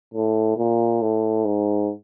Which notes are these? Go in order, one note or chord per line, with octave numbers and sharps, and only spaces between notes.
A2
A#2
A2
G#2